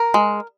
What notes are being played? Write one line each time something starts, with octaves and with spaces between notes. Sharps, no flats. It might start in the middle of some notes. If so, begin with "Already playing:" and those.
Already playing: A#4
G#3